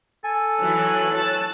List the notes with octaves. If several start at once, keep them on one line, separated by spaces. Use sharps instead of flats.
A4 G#5
E3 F#3 C#5 F#6
A5